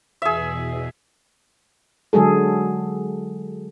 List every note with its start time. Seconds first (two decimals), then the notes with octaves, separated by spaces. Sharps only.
0.22 E2 B2 G#4 E5
2.13 D3 F#3 G#3 G#4 A4